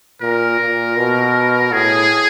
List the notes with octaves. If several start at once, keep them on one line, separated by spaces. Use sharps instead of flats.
A#2 A#4
A#2
B2
A2 G#4